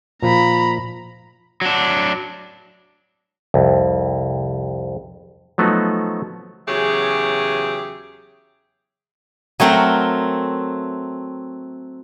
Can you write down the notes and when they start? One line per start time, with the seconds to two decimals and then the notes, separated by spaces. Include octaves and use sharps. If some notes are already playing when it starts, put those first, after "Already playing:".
0.22 A#2 F3 A#5 B5
1.62 F#3 D4
3.54 C2 F2
5.58 F3 F#3 A3 B3 D#4 F#4
6.67 E2 C#3 F#3 G4 G#4 E5
9.60 F#3 A3 C4 A#4 F#5